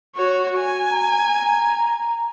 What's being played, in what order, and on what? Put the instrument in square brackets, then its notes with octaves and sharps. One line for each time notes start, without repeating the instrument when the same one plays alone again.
[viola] F#4 C#5
G#5
[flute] A#5